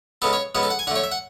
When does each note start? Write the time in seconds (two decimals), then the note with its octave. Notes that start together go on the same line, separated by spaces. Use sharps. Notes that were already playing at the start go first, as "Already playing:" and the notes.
0.22 C#3 G#3 B3 A4
0.33 C#5
0.55 C#3 G#3 B3 F#5
0.63 A4
0.70 F#5
0.79 G#5
0.87 D3 F#5
0.91 A3 C#5
1.04 E5
1.12 F#5